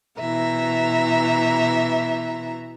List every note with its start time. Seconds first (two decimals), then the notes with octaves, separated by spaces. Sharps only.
0.19 B2 E3 E5 A#5